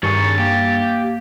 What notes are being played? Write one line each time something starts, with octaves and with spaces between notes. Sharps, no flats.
G2 D#3 G#4 C#6 A6
A#3 G4